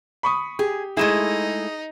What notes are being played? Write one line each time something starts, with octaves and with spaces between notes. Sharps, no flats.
B5 C#6 D#6
G4 G#4
G#3 A3 D#4 E4 G#4 E7